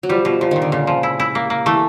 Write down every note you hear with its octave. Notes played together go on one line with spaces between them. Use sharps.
F#3
F3 G3
B2 F3
A#2 F3
A#2 D#3
D3
A#2 C#3
F3
E4
E4
A#3
A#3
E3 A3